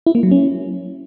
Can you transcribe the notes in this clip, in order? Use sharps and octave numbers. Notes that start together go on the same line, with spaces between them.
E4
A#3
F#3
C#4